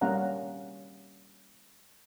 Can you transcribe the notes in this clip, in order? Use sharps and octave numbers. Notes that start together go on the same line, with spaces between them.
G3 A#3 C#4 F5 F#5 A#5